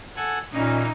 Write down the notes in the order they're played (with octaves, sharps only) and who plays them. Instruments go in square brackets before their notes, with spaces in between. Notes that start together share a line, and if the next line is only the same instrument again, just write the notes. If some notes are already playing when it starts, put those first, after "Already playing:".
[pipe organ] A4 F#5 G#5
[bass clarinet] A#2 [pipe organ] E3 A#3 [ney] C#4 [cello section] D#4